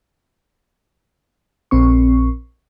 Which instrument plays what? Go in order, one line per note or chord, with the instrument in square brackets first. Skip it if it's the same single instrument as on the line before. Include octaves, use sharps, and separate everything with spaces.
[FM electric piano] A#1 C4 C#6